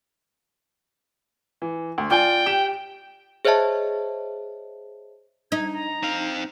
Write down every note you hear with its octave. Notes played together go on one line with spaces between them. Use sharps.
E3
D2
F4 D5 G5 G#5
G4 E7
G#4 C5 C#5 D#5 E5 A5
D#4 G#6
A#5
C4 F5